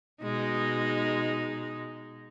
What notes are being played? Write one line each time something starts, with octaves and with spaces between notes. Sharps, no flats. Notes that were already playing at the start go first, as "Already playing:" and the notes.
B2 G#3 D#4